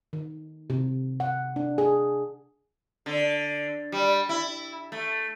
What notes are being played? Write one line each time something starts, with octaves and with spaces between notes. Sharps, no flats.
D#3
C3
F#5
D4
G#4
D3
G3
E4
A3